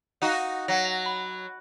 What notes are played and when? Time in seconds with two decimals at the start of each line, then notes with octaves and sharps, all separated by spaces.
0.22 D#4 F#4 F5 F#5
0.68 F#3 F#5 A#6
0.84 A#6 F7
1.06 B5